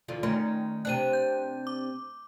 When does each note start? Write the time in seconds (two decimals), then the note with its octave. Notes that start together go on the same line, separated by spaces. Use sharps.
0.08 E2 D3 F4
0.23 D#3 A3 C#4
0.85 C3 C4 D4 F#6 D#7
1.13 G6
1.67 D6